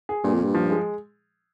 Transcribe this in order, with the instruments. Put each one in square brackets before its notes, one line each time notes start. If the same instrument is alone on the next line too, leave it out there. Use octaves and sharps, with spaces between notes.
[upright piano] G#4
[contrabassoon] G2 [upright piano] A#2
[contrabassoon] F2 [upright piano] A#2
[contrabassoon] G2
[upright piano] F3
G#3